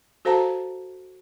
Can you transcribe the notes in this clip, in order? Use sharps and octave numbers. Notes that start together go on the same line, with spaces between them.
F#4 A4 C5 F5 A5 A#5